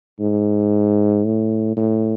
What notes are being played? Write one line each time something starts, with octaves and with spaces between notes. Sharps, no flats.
G#2
A2
A2